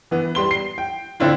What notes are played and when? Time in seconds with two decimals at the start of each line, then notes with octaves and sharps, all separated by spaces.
0.11 E3 B3
0.35 G3 C6 G7
0.51 C7
0.78 G5
1.20 D3 C4 D4 E4 F4